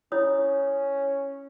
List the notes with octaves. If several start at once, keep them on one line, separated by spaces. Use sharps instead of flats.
C#4 E4 C#5 D#6